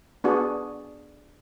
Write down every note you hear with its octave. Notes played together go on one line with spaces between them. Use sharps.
B3 D4 F#4 G#4